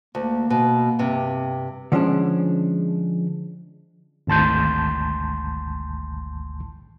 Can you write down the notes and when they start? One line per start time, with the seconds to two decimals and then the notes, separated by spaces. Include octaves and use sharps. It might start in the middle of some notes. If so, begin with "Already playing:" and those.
0.15 D2 A#3
0.50 B2
0.99 G2 C3
1.92 D3 F3 G#3 C#4 D4
4.27 G#1 D2 A5 C6 G6